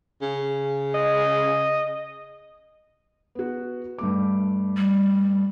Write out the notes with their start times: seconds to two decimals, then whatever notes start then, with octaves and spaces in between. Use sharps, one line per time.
0.22 C#3
0.94 D#5
3.35 B3 F#4
3.98 G2 A3 D6
4.77 G3